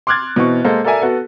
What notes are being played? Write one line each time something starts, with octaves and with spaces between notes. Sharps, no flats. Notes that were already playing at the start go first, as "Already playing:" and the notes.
C6 D6 F6 F#6 G#6 A6
B2 E3 C4 C#6
G#3 A#3 A4 C5
A4 A#4 D5 E5 G#5 A#5
B3 F#4 A4